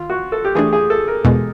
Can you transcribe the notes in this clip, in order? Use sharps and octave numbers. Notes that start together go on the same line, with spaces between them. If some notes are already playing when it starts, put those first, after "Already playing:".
Already playing: D#3 F4
F#4
A4
G4
E3 A3 D4 G#4
G#4
A4
A#4
E2 B2 G#3